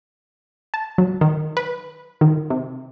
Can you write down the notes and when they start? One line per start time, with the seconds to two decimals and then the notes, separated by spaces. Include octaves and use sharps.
0.74 A5
0.98 F#3
1.21 D#3
1.57 B4
2.21 D#3
2.50 C3